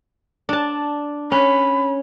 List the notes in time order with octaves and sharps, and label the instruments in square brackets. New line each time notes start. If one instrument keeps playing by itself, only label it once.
[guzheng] D4 A5
[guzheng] C#4 [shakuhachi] B5